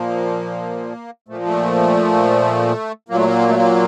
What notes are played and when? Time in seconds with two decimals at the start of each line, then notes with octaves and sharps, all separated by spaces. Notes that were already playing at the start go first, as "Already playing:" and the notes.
Already playing: A#2 F3 A#3
1.28 A#2 F3 A3
1.46 A3
3.09 A#2 F#3 A#3
3.17 A3
3.26 A#3
3.49 A3
3.55 A#3